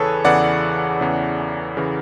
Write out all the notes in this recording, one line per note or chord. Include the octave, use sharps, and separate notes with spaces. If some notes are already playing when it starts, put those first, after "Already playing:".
Already playing: E2 C#3 E3 G#4 A4 B4 C#5
E2 C#3 E3 D5 F#5
E2 C#3 E3
C#3 E3